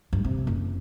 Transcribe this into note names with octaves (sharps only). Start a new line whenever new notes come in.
G2
C3
F#1